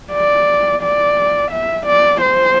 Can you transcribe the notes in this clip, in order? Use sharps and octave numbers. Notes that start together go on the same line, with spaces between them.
D5
D5
E5
D5
C5